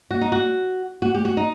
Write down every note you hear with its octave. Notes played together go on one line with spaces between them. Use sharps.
A#3 F#4
D#4
F#4
A#3 F#4
A3 G4
F#4
A3
D#4